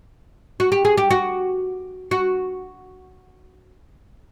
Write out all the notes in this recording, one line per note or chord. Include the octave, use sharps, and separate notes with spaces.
F#4
G4
G#4
G4
F#4
F#4